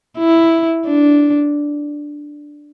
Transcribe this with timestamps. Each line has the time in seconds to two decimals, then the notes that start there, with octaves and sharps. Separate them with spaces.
0.18 E4
0.86 D4